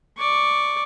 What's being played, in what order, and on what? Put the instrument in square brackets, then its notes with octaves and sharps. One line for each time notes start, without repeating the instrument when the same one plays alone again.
[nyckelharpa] D5 C#6